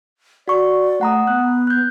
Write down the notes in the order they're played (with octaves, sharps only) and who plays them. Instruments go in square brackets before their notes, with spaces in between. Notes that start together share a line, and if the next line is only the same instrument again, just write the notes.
[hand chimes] F#4 C#6 [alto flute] D5
[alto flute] A3 [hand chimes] F#5 A#5 D#6
[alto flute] B3 [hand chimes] F#6
[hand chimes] F#6 G6